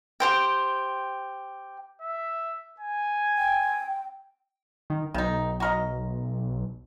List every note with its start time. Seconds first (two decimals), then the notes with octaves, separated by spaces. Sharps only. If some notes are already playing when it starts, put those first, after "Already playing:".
0.20 G4 C5 G5
2.02 E5
2.80 G#5
3.38 G5
4.90 D#3
5.14 B1 D#3 D#4
5.60 F#4 A#4 D#5